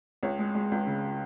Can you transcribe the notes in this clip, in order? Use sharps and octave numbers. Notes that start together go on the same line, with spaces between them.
C#2 C#5
G#3
G#3
C#2
C#3